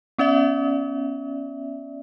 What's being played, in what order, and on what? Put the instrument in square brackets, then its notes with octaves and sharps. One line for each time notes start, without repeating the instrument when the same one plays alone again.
[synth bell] B3 C#4 D5 E5